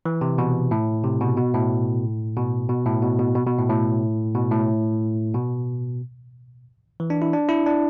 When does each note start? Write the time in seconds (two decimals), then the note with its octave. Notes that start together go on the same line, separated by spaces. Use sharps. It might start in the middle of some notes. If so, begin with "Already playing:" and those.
0.06 E3
0.21 C3
0.38 B2
0.71 A2
1.04 C3
1.21 B2
1.37 B2
1.54 A2
2.37 B2
2.69 B2
2.86 A2
3.02 B2
3.19 B2
3.36 B2
3.46 B2
3.59 A2
3.69 A2
4.35 B2
4.51 A2
5.34 B2
7.00 E3
7.10 D4
7.22 E4
7.33 D4
7.49 E4
7.66 D4